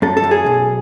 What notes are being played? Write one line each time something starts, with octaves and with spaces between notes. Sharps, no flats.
F#2 A4
A4
F#2
G#4
B1